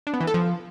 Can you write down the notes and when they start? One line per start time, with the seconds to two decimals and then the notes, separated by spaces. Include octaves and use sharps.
0.07 D4
0.14 B3
0.20 E3
0.27 A4
0.34 F3